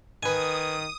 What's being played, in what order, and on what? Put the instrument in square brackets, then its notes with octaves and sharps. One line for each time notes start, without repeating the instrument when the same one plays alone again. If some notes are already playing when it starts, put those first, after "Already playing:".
[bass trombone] D#3 [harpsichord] B4 G#5 [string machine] D#6